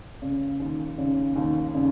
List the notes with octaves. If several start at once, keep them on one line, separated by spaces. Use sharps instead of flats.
C#3
D#2
C#3
D#2
C#3